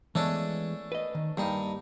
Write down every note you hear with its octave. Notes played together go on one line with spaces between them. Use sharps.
E3 G#3 A3 B3 C#4 D4
B4 D#5
D#3
G2 G3 A#3 D#4